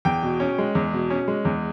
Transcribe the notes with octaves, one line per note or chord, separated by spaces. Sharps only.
E2 G5
B2
C#4
G#3
E2
B2
C#4
G#3
E2